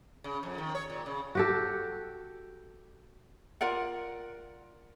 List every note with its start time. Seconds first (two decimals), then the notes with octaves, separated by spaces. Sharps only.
0.24 C#3
0.43 F2
0.58 D#3
0.75 C#5
0.90 A#2
1.06 C#3
1.35 F#4 G4 A4
3.61 F4 A#4 D5 F#5